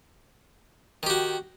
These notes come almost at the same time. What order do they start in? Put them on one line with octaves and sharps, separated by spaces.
D#3 G4 F#4